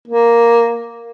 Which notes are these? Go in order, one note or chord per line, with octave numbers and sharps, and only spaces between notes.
A#3